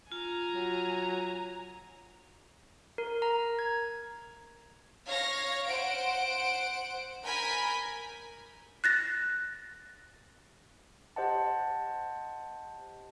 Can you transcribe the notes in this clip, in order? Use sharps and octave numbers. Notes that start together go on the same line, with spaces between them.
F4 G#5 A#5
F#3
A#4
A#5
G#6
C#5 F5 A#6
C5 F#5 D7
A#4 G#5 B5 G6 B6
F#6 A6 A#6
G4 C5 D#5 F#5 A5